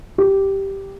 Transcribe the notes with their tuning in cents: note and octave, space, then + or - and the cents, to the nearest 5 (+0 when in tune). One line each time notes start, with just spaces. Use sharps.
G4 -5